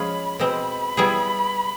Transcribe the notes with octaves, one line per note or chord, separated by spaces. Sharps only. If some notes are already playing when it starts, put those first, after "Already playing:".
Already playing: F3 G#3 C#4 F4 G#4 B5
B2 G#3 C4 B5
G3 B3 E4 G#4